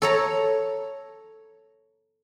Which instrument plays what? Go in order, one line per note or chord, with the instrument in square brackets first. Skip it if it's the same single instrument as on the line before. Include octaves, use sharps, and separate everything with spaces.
[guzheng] A4 C#5 A#5